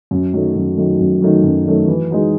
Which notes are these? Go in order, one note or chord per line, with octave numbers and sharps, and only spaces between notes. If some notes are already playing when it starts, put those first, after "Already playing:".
F#2
D#3 F#3 A3
F#2
D#3 F#3 A3
F#2
D#3 F#3 A3
F#2
D#3 F#3 A3
E3
G#3 D#4 F#4